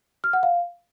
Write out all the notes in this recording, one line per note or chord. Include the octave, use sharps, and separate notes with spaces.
F6
F#5
F5